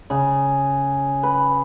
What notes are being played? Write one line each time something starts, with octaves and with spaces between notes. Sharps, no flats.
C#3
B4